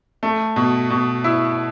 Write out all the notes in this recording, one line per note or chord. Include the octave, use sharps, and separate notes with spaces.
A3
B2
B2
E4